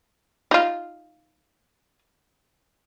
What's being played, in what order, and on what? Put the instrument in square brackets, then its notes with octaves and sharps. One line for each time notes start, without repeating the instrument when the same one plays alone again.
[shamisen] D#4 F4